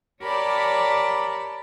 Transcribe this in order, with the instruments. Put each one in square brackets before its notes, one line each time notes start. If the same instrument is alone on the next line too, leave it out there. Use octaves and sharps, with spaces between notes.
[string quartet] G4 A#4 C#5 D5 A5 B5